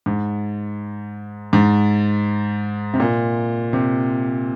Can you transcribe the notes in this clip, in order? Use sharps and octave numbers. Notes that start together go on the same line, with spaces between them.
G#2
G#2
C3
A#2
C3